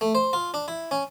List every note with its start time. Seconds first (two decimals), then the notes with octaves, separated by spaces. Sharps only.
0.01 A3
0.15 C5
0.33 F4
0.54 D4
0.68 E4
0.91 C#4